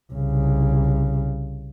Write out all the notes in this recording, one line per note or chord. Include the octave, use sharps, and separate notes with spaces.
C2 C#3